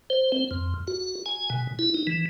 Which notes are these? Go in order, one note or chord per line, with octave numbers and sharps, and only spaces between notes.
C5
C4
F2
F#4
G#5
B2
E4
D#4
E3